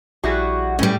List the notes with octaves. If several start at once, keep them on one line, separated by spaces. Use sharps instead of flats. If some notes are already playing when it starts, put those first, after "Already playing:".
A#1 G3 E4 F#4 G#4
A2 G3 C#4 B4